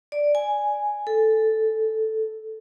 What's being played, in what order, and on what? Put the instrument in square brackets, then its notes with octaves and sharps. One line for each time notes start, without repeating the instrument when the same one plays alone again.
[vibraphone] D5
G#5
A4